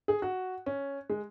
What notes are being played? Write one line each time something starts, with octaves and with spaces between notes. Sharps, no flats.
G#4
F#4
C#4
G#3